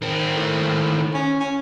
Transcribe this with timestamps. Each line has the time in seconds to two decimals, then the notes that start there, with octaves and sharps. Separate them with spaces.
0.02 D#3 C4
0.36 A2
1.14 C#4
1.40 C#4